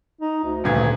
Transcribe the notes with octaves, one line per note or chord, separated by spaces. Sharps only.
D#4
D2
D#1 D2 G2 G#6